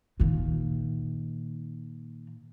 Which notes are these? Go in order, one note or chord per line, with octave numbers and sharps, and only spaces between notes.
A#2 D#3